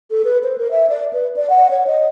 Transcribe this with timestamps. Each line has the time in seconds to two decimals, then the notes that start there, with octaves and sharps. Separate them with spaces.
0.11 A4
0.25 B4
0.43 C5
0.58 A#4
0.71 E5
0.90 D5
1.13 B4
1.36 D5
1.50 F#5
1.70 C#5
1.87 D#5